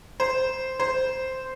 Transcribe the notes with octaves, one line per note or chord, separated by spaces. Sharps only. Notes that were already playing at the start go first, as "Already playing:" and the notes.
C5
C5